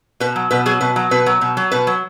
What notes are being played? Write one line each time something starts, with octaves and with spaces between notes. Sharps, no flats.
B2 B4
F#3
B2 B4
F#3 G#4
B2 B4
F#3
B2 B4
F#3
B2
F#3
B2 B4
F#3